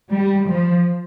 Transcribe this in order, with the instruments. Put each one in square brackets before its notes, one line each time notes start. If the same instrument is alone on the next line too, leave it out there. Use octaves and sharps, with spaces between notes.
[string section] G3
F3